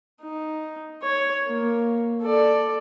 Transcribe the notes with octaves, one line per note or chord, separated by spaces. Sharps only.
D#4
C#5
A#3
A4 D5